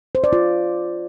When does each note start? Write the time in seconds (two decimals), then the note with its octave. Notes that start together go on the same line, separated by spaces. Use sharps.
0.15 C5
0.24 D5
0.33 F4